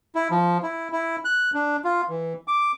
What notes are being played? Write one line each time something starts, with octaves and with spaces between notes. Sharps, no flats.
E4
F3
E4
E4
F#6
D4
F4
E3
D6